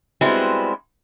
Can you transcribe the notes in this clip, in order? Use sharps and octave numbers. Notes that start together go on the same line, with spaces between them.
G3 G#3 B3 C4 E4 F#4